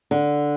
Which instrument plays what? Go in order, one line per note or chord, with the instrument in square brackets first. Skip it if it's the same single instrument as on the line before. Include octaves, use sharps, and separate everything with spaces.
[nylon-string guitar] D3